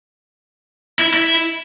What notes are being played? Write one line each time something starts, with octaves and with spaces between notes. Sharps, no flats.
E4
E4